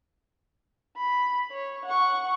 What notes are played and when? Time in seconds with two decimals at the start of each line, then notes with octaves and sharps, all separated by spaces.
0.97 B5
1.51 C#5
1.85 F#5 C#6